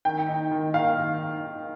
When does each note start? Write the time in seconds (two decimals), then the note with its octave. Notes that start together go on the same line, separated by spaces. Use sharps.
0.05 D#3 G5
0.28 D#4
0.51 D#3
0.74 D#3 F5